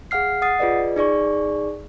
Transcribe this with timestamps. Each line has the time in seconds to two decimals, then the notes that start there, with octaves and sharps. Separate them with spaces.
0.11 G#4 F5 F#5 F6 C7
0.42 F#5 D#6 A6 C7
0.59 F4 G#4 B4 D5 D#5
0.96 D#4 G#4 D5 C#6